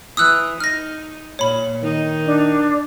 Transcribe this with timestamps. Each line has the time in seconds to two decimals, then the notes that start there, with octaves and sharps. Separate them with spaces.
0.17 E3 D#6 E6 F#6
0.60 D#4 F6 A#6
1.39 A#2 C#5 B5
1.83 D#3 D#4
2.26 D4